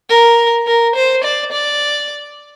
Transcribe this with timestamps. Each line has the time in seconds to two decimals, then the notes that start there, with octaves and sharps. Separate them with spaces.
0.10 A#4
0.67 A#4
0.95 C5
1.24 D5
1.52 D5